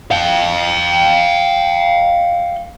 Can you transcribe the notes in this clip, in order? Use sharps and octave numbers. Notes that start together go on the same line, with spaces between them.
F5 G5